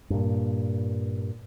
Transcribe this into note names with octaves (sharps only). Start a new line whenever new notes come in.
G2 A#2